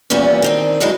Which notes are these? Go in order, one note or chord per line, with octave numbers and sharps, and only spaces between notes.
E2 A#2 E3 G3 C#4
D#3 C4 D4
G2 D3 F#3 G#3 D#4 E4